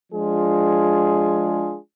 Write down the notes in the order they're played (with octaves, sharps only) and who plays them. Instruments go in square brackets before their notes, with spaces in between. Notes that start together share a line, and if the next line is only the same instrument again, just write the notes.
[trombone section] F3 G#3 D4 F4 G#4